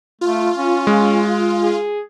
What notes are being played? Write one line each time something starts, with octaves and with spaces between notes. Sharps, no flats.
A3 F4
C#4
G#3
G#4